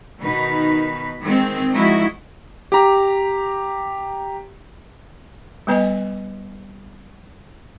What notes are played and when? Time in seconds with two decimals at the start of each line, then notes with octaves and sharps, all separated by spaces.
0.20 B2 D#3 D#4 B4
1.22 D#3 G#3 C4
1.70 F3 G#3 D#4 E4 F#4
2.72 G4 A#5
5.67 G3 B3 B4 D#5 G#5